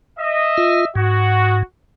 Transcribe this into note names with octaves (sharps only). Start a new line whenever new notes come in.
D#5 E5
F4
G#2 F#4